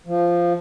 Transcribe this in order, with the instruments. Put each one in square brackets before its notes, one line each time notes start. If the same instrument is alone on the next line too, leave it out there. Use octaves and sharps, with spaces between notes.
[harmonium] F3